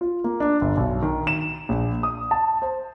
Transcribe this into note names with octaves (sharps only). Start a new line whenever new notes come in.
F4
A#3
D4
G1
B1
D#3
E7
A#1
D#6
A5
C5